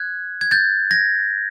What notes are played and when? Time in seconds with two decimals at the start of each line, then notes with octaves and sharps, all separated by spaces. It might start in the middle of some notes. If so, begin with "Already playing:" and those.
Already playing: F#6 G#6
0.41 G#6
0.51 G6 A6
0.91 G#6 A#6